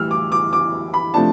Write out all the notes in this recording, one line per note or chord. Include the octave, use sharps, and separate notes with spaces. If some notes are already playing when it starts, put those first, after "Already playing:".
Already playing: A2 E3 G3 E6 F6
D6
D6
D6
B5
C3 F3 A3 D4 A5